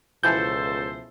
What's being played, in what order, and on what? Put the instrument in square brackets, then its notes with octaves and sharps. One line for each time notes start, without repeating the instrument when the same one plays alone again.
[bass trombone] C#2 [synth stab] B2 E3 F3 [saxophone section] A4 C5 [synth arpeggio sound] G6